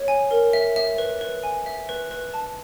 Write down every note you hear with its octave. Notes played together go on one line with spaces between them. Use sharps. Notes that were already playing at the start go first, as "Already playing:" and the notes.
Already playing: C#5
G#5
A#4
E5
E5
B4
B4
G#5
E5
B4
B4
A5